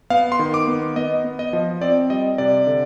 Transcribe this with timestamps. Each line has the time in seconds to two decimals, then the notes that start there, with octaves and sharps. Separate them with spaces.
0.10 B3 F5
0.32 C6
0.39 D#3
0.54 D6
0.68 B3
0.96 B3 D#5
1.24 B3
1.39 D#5
1.53 F3
1.82 C4 D5
2.10 G3 D#5
2.38 C3 D5
2.67 D3